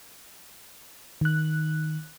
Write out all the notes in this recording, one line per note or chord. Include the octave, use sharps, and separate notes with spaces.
D#3 F#6